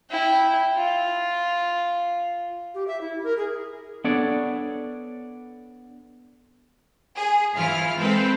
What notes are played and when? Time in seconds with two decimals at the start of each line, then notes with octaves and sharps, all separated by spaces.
0.10 E4 G5
0.75 F4
2.75 G4
2.88 E5
3.01 E4
3.24 A#4
3.37 G#4
4.04 B3 D4 A4 C#5 D5
7.18 G#4
7.56 E3 E4 F4 F6
7.98 G#3 C4 A4 B4